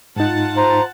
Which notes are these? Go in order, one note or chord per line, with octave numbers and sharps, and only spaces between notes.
G#2 D#4 F4 F#5 A5
C5 A#5